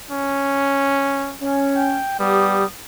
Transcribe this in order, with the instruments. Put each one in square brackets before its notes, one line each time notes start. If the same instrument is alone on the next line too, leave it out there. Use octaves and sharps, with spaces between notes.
[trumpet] C#4
[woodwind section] C#4
[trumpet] G5
[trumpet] G3 [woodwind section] B3 G4 D#6